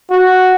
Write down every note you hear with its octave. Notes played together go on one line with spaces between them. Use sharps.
F#4